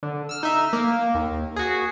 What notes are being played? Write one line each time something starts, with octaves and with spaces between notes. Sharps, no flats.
D3
E6 F6
D#4 E5
A#3
D#2
F#4 G#4